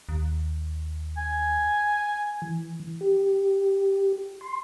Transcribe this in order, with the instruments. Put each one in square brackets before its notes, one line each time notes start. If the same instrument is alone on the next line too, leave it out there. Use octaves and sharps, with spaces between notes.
[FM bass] D#2
[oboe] G#5
[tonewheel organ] E3
G4
C6